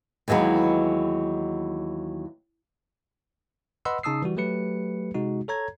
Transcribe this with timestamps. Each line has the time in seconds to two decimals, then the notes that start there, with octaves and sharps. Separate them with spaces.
0.28 D#2 E3 F#3 G#3 B3
3.85 B4 D#5 F#5 B5 C6 E6
4.03 C#3 D#4 A5 D#6 E6 C7
4.22 E3 G3 F#4
4.37 F#3 A3 G4 B4 C#7
5.14 C3 G#3 D#4 F#4
5.48 A4 C#5 A#5 G#6